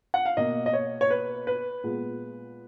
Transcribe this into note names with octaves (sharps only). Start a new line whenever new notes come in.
F#5
F5
B2 A#3 D#5
D#5
C#5
C#5
B4
B4
A#2 G#3 B3